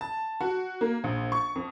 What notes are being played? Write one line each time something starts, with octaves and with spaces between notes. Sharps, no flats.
A5
F#4
A#3
A#1
C#6
F2